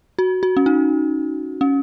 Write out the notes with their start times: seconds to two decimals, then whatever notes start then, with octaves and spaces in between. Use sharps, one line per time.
0.19 F#4
0.43 F#4
0.57 C#4
0.66 D#4
1.61 C#4